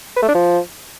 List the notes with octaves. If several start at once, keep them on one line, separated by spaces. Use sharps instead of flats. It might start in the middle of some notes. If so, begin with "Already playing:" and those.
B4
A3
D4
F3